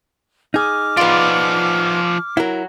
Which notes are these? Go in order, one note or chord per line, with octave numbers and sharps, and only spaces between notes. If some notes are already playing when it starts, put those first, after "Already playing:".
D#4 G#4 D6 F6
F3 B3 F4 D5
F#3 E4 A#4